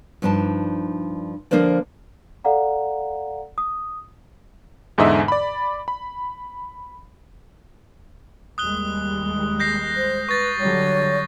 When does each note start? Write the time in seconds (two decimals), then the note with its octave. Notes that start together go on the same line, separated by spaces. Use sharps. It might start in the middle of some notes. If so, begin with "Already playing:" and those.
0.22 G2 F3 D4 D#4 A5
1.51 D3 F3 A#3 D4 C5 D5
2.44 A4 D5 F5 F#5 A#5
3.58 D#6
4.98 E2 G#2 D3 D#5 E5
5.28 D5 B5
5.88 B5
8.58 D#2 G3 G#3 D#6 F#6 G7
9.60 G6 A#6 C7
9.96 C5
10.29 B4 C#6 A6
10.60 D3 F#3 G3 C#5